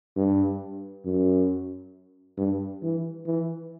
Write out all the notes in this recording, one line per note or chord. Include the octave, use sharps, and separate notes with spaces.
G2
F#2
G2
E3
E3